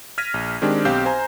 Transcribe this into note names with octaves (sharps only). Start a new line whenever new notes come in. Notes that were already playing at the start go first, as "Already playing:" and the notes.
F6 G#6 A#6 B6 D#7
A#1
D#3 G#3 C4 D4 G4
B1 C4 G4 C5 F5 G6
C5 G#5 A#5